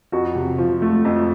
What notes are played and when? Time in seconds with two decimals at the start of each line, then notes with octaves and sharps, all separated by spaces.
0.12 F2 F#4
0.35 C3
0.58 F3
0.82 A3
1.05 F2